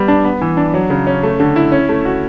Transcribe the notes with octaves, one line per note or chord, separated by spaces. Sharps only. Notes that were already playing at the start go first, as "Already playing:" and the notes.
Already playing: G3 B3
D4
B3
E3
D4
F#3
C#3
C#4
A3
D3
E4
C#4
A3
F#4